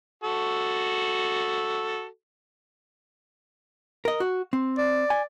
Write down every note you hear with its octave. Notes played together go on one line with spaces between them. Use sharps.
F#4 A4
A#4 D#5
F#4
C4
D5
G#5